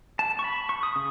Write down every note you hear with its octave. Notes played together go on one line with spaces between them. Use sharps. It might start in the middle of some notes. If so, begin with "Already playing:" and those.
A5
C#6
B5
C#6
D#6
C#3